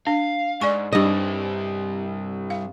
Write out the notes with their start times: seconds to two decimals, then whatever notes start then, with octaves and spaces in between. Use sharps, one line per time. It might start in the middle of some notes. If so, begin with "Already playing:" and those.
0.07 D4 F5
0.62 G#2 D5 G#5 C#6
0.93 G2 G3 C4 D#5
2.50 F5